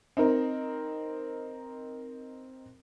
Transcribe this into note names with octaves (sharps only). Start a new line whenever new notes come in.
C4 D#4 A#4